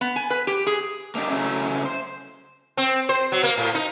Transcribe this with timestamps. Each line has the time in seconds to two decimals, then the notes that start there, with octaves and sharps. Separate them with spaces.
0.01 B3
0.16 G#5
0.30 B4
0.47 G4
0.67 G#4
1.15 A#3 D4 D#4 G4
1.30 C#3 F#3 A3 C#4 E4
1.85 C5
2.77 C4
3.09 C5
3.32 F#3
3.43 A#3
3.58 A2
3.75 D#4